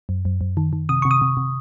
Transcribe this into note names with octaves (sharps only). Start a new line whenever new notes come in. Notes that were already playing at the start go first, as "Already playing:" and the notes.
F#2
F#2
F#2
D#3
D#3
C3 D#6
C3 C#6
D#6
C3
C3